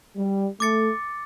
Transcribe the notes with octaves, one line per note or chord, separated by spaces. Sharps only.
G3
A3 D6 A6 C#7